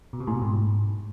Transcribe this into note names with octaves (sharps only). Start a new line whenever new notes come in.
B2
C3
A2
B2
G#2